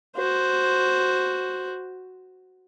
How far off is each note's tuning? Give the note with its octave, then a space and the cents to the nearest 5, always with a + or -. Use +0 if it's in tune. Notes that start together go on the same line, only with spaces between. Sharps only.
F#4 +0 C5 +0